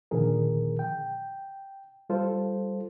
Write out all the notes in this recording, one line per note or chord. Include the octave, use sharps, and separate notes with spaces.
A#2 D3 D#3 F3 G#4 A#4
G5
G3 F4 A4 C5